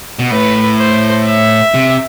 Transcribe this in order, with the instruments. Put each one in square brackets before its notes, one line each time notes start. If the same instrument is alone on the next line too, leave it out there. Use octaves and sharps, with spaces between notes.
[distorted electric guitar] B2
[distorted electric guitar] A2 [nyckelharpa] B4
[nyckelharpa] C5
E5
[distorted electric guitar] C3